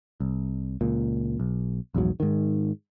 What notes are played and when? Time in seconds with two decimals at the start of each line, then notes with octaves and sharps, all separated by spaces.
0.20 C2
0.81 C#2 A#2
1.40 B1
1.94 A#1 E2 G#2 F#3
2.20 G#2 D#3